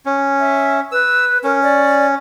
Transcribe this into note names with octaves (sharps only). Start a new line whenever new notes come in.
C#4
E5
B4 E6
C#4 A#4
D5